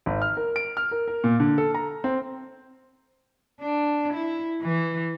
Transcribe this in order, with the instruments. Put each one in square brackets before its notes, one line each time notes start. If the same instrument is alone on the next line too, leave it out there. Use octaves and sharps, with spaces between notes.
[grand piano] G#1
F6
A#4
D7
F6
A#4
A#4
A#2
D3
A4
A#5
C4
[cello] D4
E4
E3